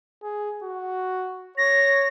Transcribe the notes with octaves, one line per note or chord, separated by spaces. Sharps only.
G#4
F#4
C#5 A#6